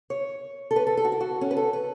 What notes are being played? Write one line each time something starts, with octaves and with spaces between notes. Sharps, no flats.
C#5
A4
B4
A4
A4
F#4
E4
F#4
C#4
B4
A4
B4